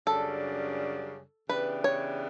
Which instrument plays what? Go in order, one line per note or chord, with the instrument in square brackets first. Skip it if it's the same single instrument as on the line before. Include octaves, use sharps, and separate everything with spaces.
[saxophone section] F#2 C#3 G3 D4 [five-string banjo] A4
[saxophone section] C#3 E3 B3 D4 G4 [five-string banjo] B4
[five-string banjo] C#5